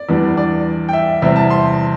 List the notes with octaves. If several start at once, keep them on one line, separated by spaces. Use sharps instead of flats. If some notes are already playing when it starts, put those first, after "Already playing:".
Already playing: D5
E2 E3 G3 D4
D5
G5
E5
E2 C3 G3 C4 E5
A5
C6